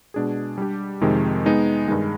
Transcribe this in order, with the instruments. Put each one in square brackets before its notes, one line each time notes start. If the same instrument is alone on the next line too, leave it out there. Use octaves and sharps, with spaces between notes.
[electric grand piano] B2 G#3 D4 G#4
G3 D4 G4
F2 C3 D#3 G#3
G#3 B3 D#4
G2 D#3 G#3